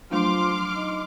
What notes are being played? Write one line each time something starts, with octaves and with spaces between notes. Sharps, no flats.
F3 F#3 A3 D4 C6 D6 F6
D#4